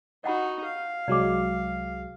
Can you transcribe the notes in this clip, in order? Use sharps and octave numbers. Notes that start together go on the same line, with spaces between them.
D#4 F#4 D#5 F#5 B5
F5
C2 F#3 G#3 D5 D6